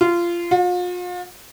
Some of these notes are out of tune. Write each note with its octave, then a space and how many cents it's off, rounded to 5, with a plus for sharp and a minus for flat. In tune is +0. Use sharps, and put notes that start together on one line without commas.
F4 -20
F4 +40